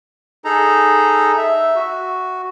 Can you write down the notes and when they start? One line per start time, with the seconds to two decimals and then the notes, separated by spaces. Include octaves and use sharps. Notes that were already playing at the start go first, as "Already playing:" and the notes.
0.45 D#4 G#4 A4 A#5
1.37 E5
1.76 F#4